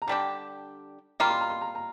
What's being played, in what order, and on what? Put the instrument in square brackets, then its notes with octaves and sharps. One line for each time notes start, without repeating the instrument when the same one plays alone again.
[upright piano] A#5
[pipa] D3 G3 D4 G4 [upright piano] A5
[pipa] G3 A#3 F4 [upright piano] A#5
[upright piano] C6
A#5
C6
A#5
A#5